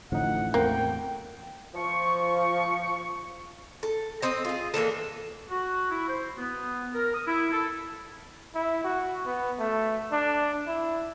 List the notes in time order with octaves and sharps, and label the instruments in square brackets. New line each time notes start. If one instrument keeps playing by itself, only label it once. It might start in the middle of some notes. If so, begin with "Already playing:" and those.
[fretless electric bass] A1 A2 F3 [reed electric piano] D3 D#4 [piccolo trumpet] F#5
[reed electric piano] E2 A3 C4 [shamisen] A#3 [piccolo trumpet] G5
[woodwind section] F3 C#6
[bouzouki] A4
C4 D#5
F4 G#4
E3 A#3 D4 A4
[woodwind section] F#4
E4
C5
B3
A#4
D#6
E4
A4
[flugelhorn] E4
F#4
B3
A3
D4
E4